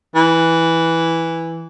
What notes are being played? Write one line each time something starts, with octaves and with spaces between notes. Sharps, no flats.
E3